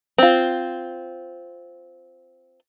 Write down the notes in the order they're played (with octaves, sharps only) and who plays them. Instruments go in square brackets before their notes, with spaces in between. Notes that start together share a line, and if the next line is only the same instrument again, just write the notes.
[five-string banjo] C4 F4